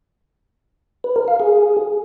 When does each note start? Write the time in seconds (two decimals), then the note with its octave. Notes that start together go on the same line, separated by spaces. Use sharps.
1.04 B4
1.16 A#4
1.28 F5
1.40 G#4